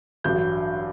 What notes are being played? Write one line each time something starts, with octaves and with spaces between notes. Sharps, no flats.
A1 G2 D3 F#3 G6